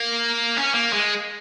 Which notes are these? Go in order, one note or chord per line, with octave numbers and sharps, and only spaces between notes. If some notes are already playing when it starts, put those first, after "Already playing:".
Already playing: A#3
C#4
A#3
G#3